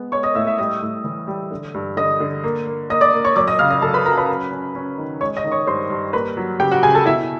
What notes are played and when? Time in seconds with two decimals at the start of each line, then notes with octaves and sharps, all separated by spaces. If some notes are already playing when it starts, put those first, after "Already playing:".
Already playing: G#3 B3
0.12 G#3 C#5 C#6
0.23 D#5 D#6
0.35 A2 E5 E6
0.47 E5 E6
0.58 G3 D#5 D#6
0.82 A2
1.04 E3
1.27 G3
1.51 D3
1.74 G2
1.97 D3 D#5 D#6
2.20 D3
2.44 A#3
2.67 A#3
2.90 A#3 D#5 D#6
3.01 D5 D6
3.13 A#3
3.25 C#5 C#6
3.36 F#2 D5 D6
3.48 D#5 D#6
3.59 C#3 F5 F6
3.70 D#5 D#6
3.82 F#2 A4 A5
3.94 B4 B5
4.05 F#3 A#4 A#5
4.17 B4 B5
4.29 C#4
4.51 C#4
4.75 C#4
4.98 D#3
5.21 G#3 C#5 C#6
5.37 D#5 D#6
5.44 D#3
5.52 C#5 C#6
5.67 G2 C5 C6
5.90 G2
6.13 A#3 B4 B5
6.37 F#3
6.60 C#3 G4 G5
6.71 F#4 F#5
6.83 C#3 G#4 G#5
6.95 A4 A5
7.06 B2 E4 E5